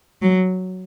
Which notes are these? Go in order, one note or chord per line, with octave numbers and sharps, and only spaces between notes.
F#3